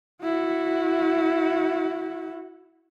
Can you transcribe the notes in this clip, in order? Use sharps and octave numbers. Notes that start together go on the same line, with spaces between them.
E4 F#4